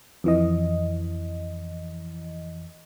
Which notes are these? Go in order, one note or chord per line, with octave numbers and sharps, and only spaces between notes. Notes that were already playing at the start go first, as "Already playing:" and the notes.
F2 E3 D#5